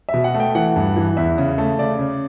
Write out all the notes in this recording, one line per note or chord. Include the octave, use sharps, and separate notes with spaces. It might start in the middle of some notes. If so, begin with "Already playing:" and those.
E5
B2
F#5
A3
G5
E3 F#5
G2
E3
E2 E5
C#3
A3
C#3 D5
C#3